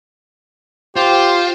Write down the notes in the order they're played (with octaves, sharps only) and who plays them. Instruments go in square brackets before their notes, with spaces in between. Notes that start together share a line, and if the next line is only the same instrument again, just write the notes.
[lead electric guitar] F4 [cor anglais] G4 [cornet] C5